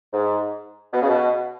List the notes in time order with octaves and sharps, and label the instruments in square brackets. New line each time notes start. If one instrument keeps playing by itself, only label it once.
[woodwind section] G#2
B2
C#3
B2